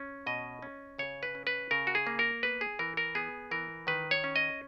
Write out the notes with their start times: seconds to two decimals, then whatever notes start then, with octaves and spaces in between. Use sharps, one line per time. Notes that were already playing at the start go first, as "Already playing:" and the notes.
Already playing: C#4
0.26 B2 D#5
0.62 C#4
0.98 C#3 C#5
1.23 B4
1.35 C#4
1.47 B4
1.71 C#3 A#4
1.87 F#4
1.95 G#4
2.07 A#3
2.19 A#4
2.43 B3 B4
2.61 G#4
2.79 E3 A#4
2.97 A#4
3.15 B3 G#4
3.51 E3 A#4
3.87 D#3 B4
4.11 C#5
4.24 C#4
4.36 D#5